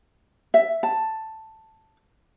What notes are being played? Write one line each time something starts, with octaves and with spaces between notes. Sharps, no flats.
E5
A5